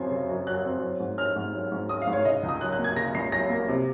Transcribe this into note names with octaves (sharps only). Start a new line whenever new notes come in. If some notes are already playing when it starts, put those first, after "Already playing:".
Already playing: F#2 C#3 F#3 C4 G#6 C7
C#3
F#2
F#3 F#6
C4
F#3
G#2
C#4 F6
G#2
F#3
G#2
C#4 D#6
F5
G#2
C#5
C#3 D#5
C#2
D#6
F#3 F#6
F#6
A#3
G#6
C#3 A#6
C#2 C7
F#3 A#6
A#3
C3